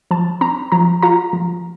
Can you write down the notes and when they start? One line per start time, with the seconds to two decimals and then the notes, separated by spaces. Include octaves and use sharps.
0.11 F3 A5
0.41 C4 A#5
0.72 F3 A#5
1.02 F4 A#5
1.33 F3